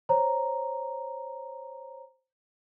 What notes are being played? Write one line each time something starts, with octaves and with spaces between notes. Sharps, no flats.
C5 C#5 A#5